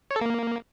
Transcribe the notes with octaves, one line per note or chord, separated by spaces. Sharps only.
C#5
A4
A#3